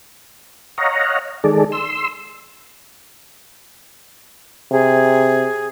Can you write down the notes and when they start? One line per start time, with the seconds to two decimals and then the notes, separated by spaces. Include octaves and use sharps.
0.78 C#5 D#5 F5 F#5 A#5
1.44 D#3 G#3 G#4 A4 D5
1.72 C6 E6
4.71 C3 G#4